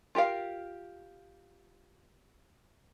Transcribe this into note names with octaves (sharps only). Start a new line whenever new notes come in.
F4 G4 A#4 F5